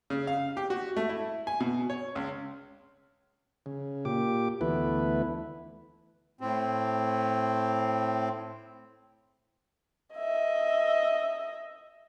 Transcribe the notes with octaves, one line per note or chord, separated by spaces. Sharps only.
C#3
F5
G4
F#4
A3
E4
G#5
B2
C#5
C#2
C#3
A#2 G4 D6
D2 E3 A3 B3 E4 B4
A2 C4
D#5 E5